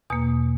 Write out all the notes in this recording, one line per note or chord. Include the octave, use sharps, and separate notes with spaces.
E2 B2 A#3 D#6